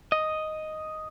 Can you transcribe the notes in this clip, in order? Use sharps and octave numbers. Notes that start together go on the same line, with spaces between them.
D#5